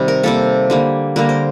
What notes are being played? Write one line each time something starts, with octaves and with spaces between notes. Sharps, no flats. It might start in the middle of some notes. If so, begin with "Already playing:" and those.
Already playing: C3 D#3 G3
A#4
C3 G3 A#3 A4
D3 G3 A#3
D3 G3 A#3 A#4
C5